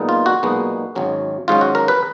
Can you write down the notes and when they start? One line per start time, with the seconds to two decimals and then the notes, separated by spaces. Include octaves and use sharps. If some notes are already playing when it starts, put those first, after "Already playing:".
Already playing: B1 A#2 G#3 B3 D#4
0.09 F4
0.26 F#4
0.43 B1 A#2 G#3 B3 D#4
0.95 G#1 G#2 F#3 C#4
1.48 G#1 G#2 F#3 C#4 F4
1.61 F#4
1.75 A#4
1.88 B4